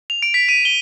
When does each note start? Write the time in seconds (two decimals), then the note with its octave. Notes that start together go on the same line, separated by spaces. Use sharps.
0.10 F7
0.22 D7
0.34 B6
0.49 D#7
0.65 G7